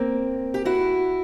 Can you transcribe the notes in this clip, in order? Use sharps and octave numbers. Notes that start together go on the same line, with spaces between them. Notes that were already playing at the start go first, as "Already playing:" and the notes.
Already playing: A#3 C4
G4
E4 F#4